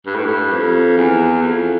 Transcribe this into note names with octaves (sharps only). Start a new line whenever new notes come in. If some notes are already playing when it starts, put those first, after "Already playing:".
G2
A2
G2
F2
E2
F2